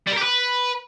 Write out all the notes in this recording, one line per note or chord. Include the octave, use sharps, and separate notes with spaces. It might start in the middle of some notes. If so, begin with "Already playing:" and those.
G3
A#4
G4
B4